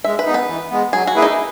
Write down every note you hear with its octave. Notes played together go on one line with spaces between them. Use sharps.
G#3 E5
B4
B3 D#4
B4
E3
G#3 B3
F#3 G#4
F#4
A#3 E4 G#4 B4
D#4